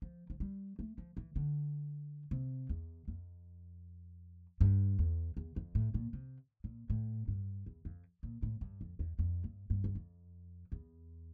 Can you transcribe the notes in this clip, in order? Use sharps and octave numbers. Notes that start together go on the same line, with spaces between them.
F3
F3
G3
A3
F3
E3
D3
C3
E2
F2
G2
E2
E2
F2
A2
A#2
C3
A#2
A2
G2
E2
F2
A#2
A2
G2
F2
E2
F2
G2
G2
E2
F2
E2